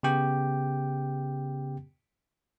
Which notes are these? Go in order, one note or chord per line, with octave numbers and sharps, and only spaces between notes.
C#3 B3 G4 G5